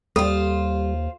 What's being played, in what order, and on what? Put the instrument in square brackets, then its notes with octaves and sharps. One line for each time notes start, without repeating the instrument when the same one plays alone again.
[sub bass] D#2 [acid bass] G3 [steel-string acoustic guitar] F4 C5 [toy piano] A4